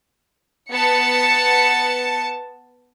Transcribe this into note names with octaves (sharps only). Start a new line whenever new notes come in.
B3 A5 C#7